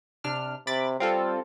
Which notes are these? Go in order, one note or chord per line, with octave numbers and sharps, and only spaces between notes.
C3 D4 F6
C3 B5 D6 A6
G3 C4 F4 A4